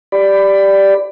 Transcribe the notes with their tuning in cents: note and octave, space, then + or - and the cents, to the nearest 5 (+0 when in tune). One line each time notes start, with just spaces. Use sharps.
G4 +0 D5 +0 B5 +20